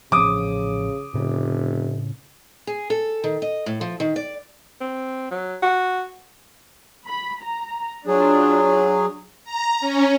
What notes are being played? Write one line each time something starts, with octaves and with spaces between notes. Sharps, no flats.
A1 C#3 F3 D6 D#6
F1 A2 C#3
G#4
A4
D#3
D#5
A2
F3
D#3
D5
C4
F#3
F#4
B5
A#5
F#3 D4 F4 G#4
A#5
C#4